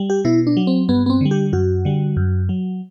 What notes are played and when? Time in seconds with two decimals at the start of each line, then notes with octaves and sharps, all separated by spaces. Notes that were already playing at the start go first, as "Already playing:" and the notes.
Already playing: G3
0.10 G4
0.25 B2 E4
0.47 D4
0.57 F#3
0.67 C4
0.89 G2 B3
1.06 B3
1.10 C4
1.21 D3 G3
1.31 G4
1.53 F#2 F#4
1.85 D3 G3
2.17 F#2
2.49 F#3